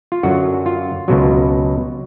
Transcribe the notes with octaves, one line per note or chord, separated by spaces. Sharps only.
F4
F#2 D3 F#3 F#4
F4
C#2 B2 F#3